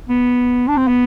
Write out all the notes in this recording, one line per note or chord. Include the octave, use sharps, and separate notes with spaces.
B3
D4
C4
B3